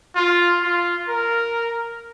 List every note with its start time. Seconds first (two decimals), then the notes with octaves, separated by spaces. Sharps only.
0.15 F4
0.62 F4
1.08 A#4